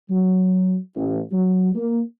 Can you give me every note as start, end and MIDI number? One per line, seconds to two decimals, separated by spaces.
0.10 0.77 54
0.96 1.20 33
1.32 1.71 54
1.75 2.01 58